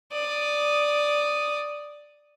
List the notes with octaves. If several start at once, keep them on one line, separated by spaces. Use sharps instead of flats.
D5 D#6